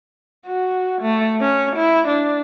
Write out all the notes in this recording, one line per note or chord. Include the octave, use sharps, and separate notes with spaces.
F#4
A3
C#4
E4
D4